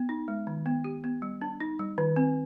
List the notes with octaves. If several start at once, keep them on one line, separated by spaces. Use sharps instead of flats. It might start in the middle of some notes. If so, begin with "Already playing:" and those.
Already playing: B3
D#4
G#3
D#3
B3
G4
B3
G3
D4
D#4
G3
D#3
C4